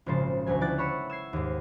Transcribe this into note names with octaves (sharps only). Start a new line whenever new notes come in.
G#1 A#2 C#3 F3 C5 A6
D2 B2 F#3 G#5
F3 E4 D5 G5 F#6 A6
C#5 F#5 B5 C#6 E6
E6 G#6 C7
D#2 G#2